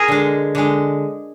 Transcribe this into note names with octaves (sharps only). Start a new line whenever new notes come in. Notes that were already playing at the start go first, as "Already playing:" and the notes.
Already playing: G#4 A#4
D3 G#3
D3 G#3